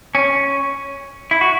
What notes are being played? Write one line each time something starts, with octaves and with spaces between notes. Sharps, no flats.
C#4
E4
F#4